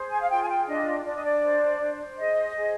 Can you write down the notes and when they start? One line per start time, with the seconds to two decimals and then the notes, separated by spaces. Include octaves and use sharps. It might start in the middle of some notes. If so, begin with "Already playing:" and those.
Already playing: G#4 C5
0.11 G#5
0.20 F5
0.29 F4 G5
0.42 G#5
0.48 G5
0.67 D4 D#5
1.05 D4 D5
1.15 D#5
1.23 D5
1.42 C5
1.81 C5
2.18 G#4 D#5
2.56 G#4